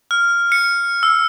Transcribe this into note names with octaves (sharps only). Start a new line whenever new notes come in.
F6
C#7
E6